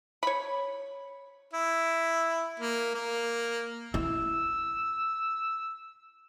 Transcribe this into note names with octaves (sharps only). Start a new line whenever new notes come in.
C#5 B5
E4
A#3
A#3
E4 E6